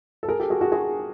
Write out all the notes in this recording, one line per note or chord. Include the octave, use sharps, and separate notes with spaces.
A4
G#4 A#4
G4 A4
F#4 G#4
F#4 G#4
F#4 G#4